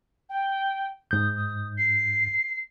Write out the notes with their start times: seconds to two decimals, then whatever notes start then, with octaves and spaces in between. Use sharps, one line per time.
0.29 G5
1.11 G#2 D#6 G6
1.36 D#6
1.77 C7